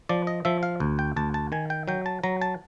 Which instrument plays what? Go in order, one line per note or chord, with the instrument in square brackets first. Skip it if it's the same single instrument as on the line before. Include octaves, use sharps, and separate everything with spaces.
[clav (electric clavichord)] F3 D5
D#5
F3 E5
F5
D2
G5
D2 A5
A5
D#3 G#5
G5
F#3 G5
A5
F#3 A#5
A5